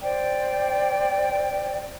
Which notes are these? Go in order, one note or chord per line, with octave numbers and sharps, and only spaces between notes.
C5 D5 G5